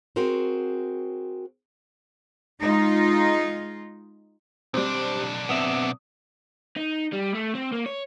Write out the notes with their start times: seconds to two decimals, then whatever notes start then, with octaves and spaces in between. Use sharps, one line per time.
0.16 C4 F#4 G#4 A#4 C5
2.62 G#3 D#4 F4
4.74 B1 G3 C4 D4
5.49 B3 C4 E5 D#6
6.77 D#4
7.12 G3
7.34 A3
7.55 C4
7.72 A#3
7.86 C#5